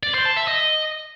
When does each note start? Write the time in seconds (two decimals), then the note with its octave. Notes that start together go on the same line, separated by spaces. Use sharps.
0.03 D5
0.14 C5
0.25 A5
0.37 E5
0.48 D#5